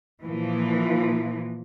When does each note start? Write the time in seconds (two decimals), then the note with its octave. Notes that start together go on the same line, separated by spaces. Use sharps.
0.23 A#2 E3 F3